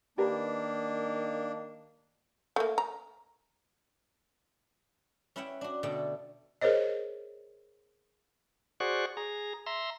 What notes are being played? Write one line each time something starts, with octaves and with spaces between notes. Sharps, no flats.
D#3 A#3 D4 G4 A#4 B4
A3 A#3
A#5
C#4 E4 B4 E5 F#5 G5
D4 F#4
B2 D3 A3 D5 G5
G#4 A#4 C5 C#5 D#5
F#4 G#4 C5 D5 F#5 C#6
G#4 A#5
E5 A#5 C6